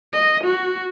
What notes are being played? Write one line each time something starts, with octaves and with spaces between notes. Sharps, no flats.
D#5
F#4